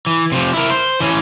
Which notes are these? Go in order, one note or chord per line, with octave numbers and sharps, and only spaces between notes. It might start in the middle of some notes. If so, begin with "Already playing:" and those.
E3
C3 F3
E4 A#4
C5
E3 C#4